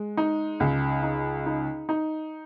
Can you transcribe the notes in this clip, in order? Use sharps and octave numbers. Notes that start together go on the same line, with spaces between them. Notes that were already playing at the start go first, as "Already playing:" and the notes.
Already playing: G#3
D#4
C#2
D#4
D#4
D#4